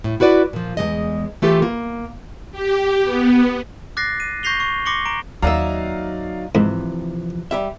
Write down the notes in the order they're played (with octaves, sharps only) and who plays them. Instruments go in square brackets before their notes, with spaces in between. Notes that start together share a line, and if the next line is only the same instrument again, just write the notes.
[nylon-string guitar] A2
E4 F#4 B4 D5
A#2 F3
E2 F3 G#3 D#5
E3 A3 F4 G4 A4
A#3
[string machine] G4
B3
[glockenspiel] D6 F#6 A6 A#6 C7
D#7
C#6 G6 A#6 C7 F7 G7
C#6
C6 D6 A#6 C#7 F#7 G7
A#5 D7
[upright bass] D#2 [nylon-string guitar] F#3 D#4 E5 [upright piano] D5 F5 A#5
[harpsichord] G#2 [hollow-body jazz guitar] C3 E3 F3
[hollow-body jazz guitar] G3 G4 E5